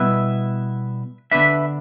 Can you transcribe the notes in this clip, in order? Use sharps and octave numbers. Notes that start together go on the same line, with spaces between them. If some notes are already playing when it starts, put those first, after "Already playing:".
Already playing: B2 G3 B3 E4 B4 E5
D3 B3 D4 B4 E5